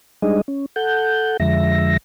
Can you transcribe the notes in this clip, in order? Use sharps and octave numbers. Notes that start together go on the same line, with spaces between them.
G3 G#3 D4 D#4 G#4 D#5
C#4
A4 F#5 G6
F2 D3 F3 G#3 E5 A#6